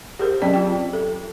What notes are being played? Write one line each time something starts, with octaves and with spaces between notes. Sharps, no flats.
G4 G#4 A#4 C5
F#3 C4 C#4 D5 G5 A5
F4 G5
A4